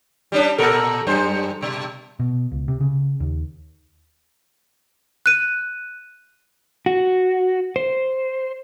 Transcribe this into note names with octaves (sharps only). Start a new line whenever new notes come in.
G3 C#4 D4
A#2 A4 A#4
F#2 G3 C5
G2 B2
B2
C#2
C3
C#3
D#2
F#6 D#7
F#4
C5